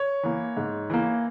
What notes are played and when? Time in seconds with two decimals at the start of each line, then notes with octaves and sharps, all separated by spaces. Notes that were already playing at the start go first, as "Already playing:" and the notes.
Already playing: C#5
0.23 E3 A#3
0.57 G#2
0.90 E3 A#3